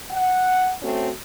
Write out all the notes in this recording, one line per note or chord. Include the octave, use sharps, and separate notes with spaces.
F#5
A3 C4 C#4 F#4